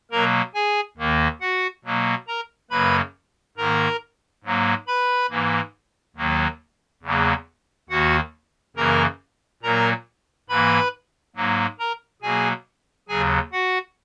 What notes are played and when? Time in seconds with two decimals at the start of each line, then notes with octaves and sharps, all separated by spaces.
0.11 B2 F#3 A#3 A#4 A#5
0.54 G#4 G#5
0.98 D#2 D#3 A#3
1.41 F#4 F#5
1.85 B2 F#3 A#3
2.27 A#4 A#5
2.71 F#2 C#3 F#3 A#3 B4 B5
3.57 G#2 D#3 A#3 A#4 A#5
4.44 G#2 F#3 A#3
4.87 B4 B5
5.30 G#2 E3 A#3
6.16 D#2 D#3 F#3 A#3
7.03 E2 C#3 F#3 A#3
7.90 D#2 D#3 A#3 F#4 F#5
8.76 F#2 C#3 E3 A#3 A#4 A#5
9.63 A#2 F#3 A#3 A#4 A#5
10.49 G#2 E3 A#3 B4 B5
11.36 G#2 F#3 A#3
11.79 A#4 A#5
12.22 B2 F#3 A#3 G#4 G#5
13.09 D#2 C#3 F#3 G#4 G#5
13.52 F#4 F#5